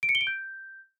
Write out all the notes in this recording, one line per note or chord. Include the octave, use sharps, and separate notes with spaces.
D7
C#7
G7
D7
G6